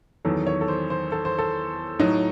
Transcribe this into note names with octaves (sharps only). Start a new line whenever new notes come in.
E2 D#3 F#3 A4
C#5
A4
C5
C5
A4
C5
A4
A2 F#3 D#4